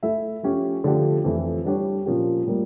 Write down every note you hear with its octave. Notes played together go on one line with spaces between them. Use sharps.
A3 E4 A4 E5
F3 A3 C#4 G4
D3 F3 A3 D4 G4
F2 E3 A3
G3 D4 G4 C#5
A#2 F3 A#3 C#4 G4
A2 G3 A#3